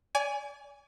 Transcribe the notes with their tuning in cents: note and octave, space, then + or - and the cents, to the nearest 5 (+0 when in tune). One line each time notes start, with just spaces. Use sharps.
D5 -40 G#5 +0